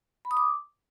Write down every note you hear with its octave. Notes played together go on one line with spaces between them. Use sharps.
B5
D#6
D6